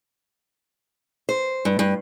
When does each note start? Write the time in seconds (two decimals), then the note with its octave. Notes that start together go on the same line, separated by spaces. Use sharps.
1.29 C5
1.65 G2
1.79 G2